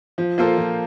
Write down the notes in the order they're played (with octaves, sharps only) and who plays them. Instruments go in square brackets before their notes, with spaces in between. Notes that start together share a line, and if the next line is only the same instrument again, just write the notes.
[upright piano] F3
A#3 F4 A4 C5
F3